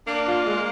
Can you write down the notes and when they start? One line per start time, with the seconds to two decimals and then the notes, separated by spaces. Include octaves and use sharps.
0.07 A#3 D4
0.27 F4
0.46 G#3